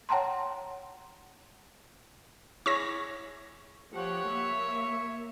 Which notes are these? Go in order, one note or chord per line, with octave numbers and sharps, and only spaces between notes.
C#5 F#5 G5 A5 A#5 C6
E4 G#4 C#5 C#6 E6 A#6
F3 G4 C#5 F#5
A#3 E5